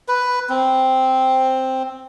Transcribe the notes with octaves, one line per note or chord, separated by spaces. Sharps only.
B4
C4